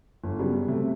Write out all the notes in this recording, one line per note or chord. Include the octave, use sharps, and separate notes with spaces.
G1
C#3 F#3 G3 B3
C3 A3